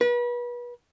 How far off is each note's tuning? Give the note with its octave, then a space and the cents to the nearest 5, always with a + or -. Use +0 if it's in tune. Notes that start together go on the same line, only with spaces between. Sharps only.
B4 -35